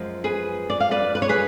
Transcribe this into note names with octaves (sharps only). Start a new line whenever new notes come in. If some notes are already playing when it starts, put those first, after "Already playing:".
Already playing: F#2 F3 G#3
G#4 B4
D5
F5
B4 D5
B4
C#5
G#4 B4